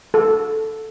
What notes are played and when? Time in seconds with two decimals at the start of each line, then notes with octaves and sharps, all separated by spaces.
0.14 A4